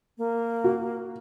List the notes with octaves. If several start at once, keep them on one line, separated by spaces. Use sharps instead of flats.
A#3
F#4